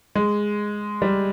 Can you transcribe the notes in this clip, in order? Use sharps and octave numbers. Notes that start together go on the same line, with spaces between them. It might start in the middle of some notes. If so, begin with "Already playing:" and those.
G#3
G3